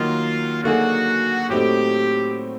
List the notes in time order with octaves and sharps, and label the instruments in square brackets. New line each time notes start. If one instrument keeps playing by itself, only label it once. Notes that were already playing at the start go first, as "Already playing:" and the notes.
Already playing: [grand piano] D#3 F#3 A#3 D#4 F#4 [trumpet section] F4
[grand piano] D3 F#3 A#3 D#4 G#4 [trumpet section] F#4
[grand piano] A2 F#3 A3 C4 D#4 [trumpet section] G4